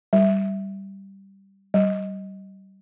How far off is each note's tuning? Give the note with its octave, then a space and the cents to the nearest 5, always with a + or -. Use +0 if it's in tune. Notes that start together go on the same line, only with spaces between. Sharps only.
G3 -5
G3 -25